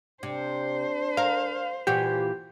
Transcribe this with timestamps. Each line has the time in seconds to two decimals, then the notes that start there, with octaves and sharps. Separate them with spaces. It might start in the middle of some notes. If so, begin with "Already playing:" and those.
0.23 C3 D4 C5
1.17 A#4 F5
1.87 A#2 E3 F#4 G4